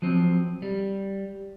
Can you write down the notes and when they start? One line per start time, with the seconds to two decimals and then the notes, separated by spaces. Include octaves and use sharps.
0.02 F3 F#3 C4
0.62 G3